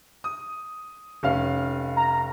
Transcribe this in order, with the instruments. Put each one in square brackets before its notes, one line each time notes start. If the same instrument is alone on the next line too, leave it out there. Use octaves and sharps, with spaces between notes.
[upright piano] D#6
F1 C#4 F5
[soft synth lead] A#5